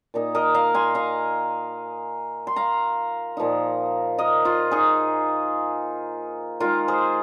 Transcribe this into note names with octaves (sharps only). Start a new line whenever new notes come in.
A#2 A#3 D#4
A#4 D#5
F5 A#5
G#5 C6
F5 A#5
C6
F5 A#5
A#2 F3 A#3 D#4
A#4 D#5
F4
D#4 G#4
D#3 G#3 D#4 F4 A#4
G#4 C5